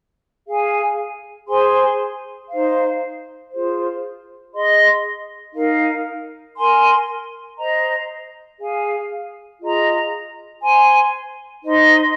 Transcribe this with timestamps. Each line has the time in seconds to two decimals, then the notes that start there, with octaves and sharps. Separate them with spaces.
0.45 G#4 F5 G#5
1.47 G#4 C5 G#5 C6
2.50 D#4 C5 F5
3.50 F4 G#4 C5
4.53 G#4 D#5 C6
5.53 D#4 A#4 F5
6.56 A#4 G#5 C6
7.57 C5 D#5 A#5
8.59 G#4 F5 G#5
9.60 F4 G#4 D#5 A#5
10.62 C5 G#5 C6
11.63 D#4 C5 D#5 C6